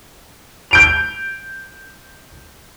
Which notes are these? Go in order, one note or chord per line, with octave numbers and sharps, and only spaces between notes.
G6 D7 F7